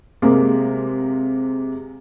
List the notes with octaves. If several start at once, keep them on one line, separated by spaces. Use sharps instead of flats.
C3 G#3 A#3